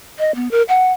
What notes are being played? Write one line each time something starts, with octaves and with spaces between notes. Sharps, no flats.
D#5
B3
A#4
F#5